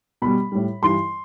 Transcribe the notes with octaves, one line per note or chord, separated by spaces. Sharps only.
B2 G3 B5
A2 G3
G2 E3 G3 C6